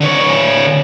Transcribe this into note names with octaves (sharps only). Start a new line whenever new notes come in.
D3 C#5